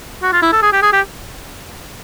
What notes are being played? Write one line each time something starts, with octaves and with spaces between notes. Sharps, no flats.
F#4
F4
E4
A4
G#4
G4
G#4
G4